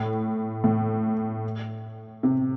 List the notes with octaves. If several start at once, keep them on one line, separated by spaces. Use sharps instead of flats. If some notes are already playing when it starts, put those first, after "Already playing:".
Already playing: A2
A2
C3